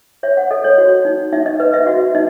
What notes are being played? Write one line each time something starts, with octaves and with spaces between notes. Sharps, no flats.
C#5 E5
F#5
A4 D#5
C#5
F#4 C#5
D#4
D#4 E5
D#5
B4 D#5
E5
F#4 E5
D#4 D#5